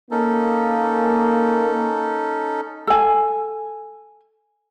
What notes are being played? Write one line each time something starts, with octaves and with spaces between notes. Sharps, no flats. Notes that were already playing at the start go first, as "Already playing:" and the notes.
A#3 C#4 D#4 A4
A4 G#5